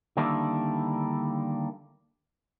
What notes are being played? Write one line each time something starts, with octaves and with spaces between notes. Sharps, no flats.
D3 D#3 G3 A#3 D4 E4